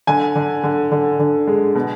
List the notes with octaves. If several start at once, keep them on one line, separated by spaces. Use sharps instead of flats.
D3 G#5
D3
D3
D3
D3
G#3
B2